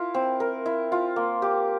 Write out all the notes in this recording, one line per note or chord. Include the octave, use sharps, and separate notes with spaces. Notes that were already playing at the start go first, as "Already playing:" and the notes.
Already playing: E4 F4 A#4
C4
A#4
E4
F4
A#3
G4